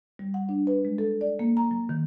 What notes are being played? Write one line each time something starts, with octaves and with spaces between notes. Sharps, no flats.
G3
F#5
D4
B4
G#3
A4
D5
A#3
A#5
F#3
D#3